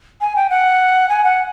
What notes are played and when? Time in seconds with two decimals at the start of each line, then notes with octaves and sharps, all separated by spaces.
0.21 G#5
0.36 G5
0.50 F#5
1.09 G#5
1.24 F#5